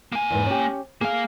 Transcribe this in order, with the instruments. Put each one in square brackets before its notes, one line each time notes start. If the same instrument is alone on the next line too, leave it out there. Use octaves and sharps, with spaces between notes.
[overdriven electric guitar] A#3 G#5
[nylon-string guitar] E2 G#2 B3
C#4 G4
[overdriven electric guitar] A#3 F5 [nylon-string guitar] G#4